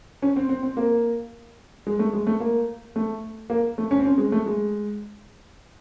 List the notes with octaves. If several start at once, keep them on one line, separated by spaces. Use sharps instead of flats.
C#4
C4
C4
C4
A#3
G#3
A3
G#3
A3
A#3
A3
A#3
A3
C#4
C4
C#4
G#3
A3
G#3